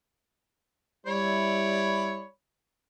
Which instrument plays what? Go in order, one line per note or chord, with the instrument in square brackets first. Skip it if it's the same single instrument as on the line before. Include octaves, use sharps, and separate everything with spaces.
[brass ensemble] G3 E4 [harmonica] C#5 D5 B5